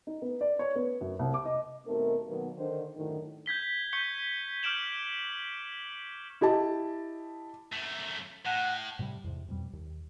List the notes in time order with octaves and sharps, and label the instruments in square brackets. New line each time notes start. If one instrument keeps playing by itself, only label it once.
[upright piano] D#4
B3
D5
C#5
B3
F#2
C2
D6
D#5
[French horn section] D#2 B2 A3 C4 D#4 A#4
B2 D#3 F#3 A#3 B3
D3 D#3 C5
F#2 A2 D3 D#3
[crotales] G6 G#6 B6 G7
C#6 G6 C#7 G7
D6 F6 G6 D7 E7 F#7
[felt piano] E4 G4 D#5 A5
[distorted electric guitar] F#2 A3
[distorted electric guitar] A2 [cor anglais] F#5
[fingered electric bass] A2 C3 D#3 G3
E2 G#2 C3
F2 B2 G3
D#2